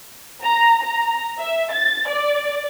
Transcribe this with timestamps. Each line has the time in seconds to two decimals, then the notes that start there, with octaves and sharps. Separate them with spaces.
0.43 A#5
0.84 A#5
1.39 E5
1.72 A6
2.08 D5